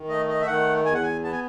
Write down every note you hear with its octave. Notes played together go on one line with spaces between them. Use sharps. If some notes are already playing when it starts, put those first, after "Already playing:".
Already playing: D#3
A3 D#5
D#5
E5
D#3 F#5
E2 G#5
F#5
G#5
B3 A5
G#5